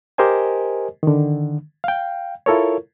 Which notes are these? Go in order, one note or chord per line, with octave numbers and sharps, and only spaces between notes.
G4 A#4 C5 D#5 G#5
D3 D#3
F5 G5
E4 F4 A4 A#4 C#5